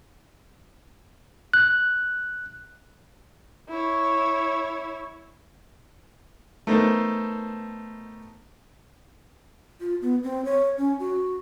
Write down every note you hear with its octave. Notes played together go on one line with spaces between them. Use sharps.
F#6
E4 C#5
A3 B3 D#4 A4 A#4 C5
F4
B3
C4
C#5
C#4
F#4